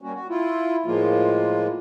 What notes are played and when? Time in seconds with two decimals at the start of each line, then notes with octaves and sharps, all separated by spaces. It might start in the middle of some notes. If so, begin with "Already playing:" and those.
0.02 G3 A#3 C#4 F#4
0.13 F#4
0.29 E4 F4
0.86 A2 F3 G#3 A#3 F4